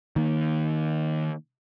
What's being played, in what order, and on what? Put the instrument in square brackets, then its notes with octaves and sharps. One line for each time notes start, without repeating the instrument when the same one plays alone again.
[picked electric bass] D#3 A#3